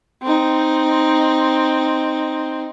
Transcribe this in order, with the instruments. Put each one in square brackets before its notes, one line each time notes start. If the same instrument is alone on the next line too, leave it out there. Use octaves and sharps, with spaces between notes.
[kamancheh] C4 D#4